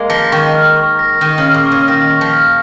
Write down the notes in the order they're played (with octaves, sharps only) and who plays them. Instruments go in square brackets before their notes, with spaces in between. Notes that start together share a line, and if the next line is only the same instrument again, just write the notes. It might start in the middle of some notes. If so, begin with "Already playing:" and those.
Already playing: [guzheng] G#3 A#3
[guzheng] F3 [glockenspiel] A#6
[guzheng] D#3 [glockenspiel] C#6
[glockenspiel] F6
C#6
A#6
[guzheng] D#3 [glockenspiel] C#6
[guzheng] C#3
[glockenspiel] F6
[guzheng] A#2
[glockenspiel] C#6
[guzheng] C#3
[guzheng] D#3 [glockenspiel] A#6
[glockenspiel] C#6
[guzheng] F3
[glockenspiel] F6